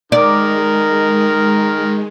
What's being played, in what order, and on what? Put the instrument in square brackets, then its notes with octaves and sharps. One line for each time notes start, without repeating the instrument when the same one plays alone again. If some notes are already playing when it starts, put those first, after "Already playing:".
[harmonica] D#3 [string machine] G#3 [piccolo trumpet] A#4 [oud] D5